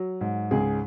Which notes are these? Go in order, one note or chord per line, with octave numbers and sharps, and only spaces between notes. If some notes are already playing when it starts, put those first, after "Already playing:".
Already playing: F#3
G#2
C#2 G#4